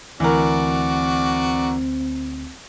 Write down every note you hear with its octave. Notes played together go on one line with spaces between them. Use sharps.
D2 E3 C4 F#4 A#4 D5